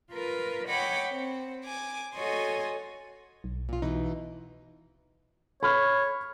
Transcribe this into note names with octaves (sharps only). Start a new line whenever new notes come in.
F4 A#4 B4
C#5 D#5 F#5 G5 B5 D6
C4
G#5 D6
F#4 A4 C#5 D#5 G#5 C6
B1
A#2 F4
B2 E3 D#4
C#5 B5 F6